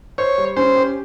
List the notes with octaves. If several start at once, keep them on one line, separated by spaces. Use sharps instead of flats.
C5 C#5
G3
C#4 C5
G4